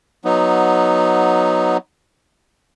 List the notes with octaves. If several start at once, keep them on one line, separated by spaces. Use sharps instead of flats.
F#3 B3 D#4